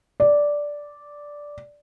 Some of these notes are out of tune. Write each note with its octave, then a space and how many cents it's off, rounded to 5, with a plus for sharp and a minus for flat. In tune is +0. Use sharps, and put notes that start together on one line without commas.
D5 -5